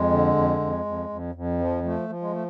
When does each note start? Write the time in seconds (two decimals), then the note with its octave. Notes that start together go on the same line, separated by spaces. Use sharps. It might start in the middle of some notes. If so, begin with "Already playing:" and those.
Already playing: F2 G#3
0.10 D3
0.35 F2
0.60 F2
0.85 F2
1.09 F2
1.35 F2
1.59 F3
1.84 F3 A3
2.09 F3
2.21 G#3
2.32 A3